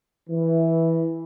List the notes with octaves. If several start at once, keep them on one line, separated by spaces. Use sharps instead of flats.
E3